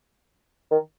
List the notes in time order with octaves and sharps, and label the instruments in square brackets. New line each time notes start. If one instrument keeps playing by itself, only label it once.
[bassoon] D#3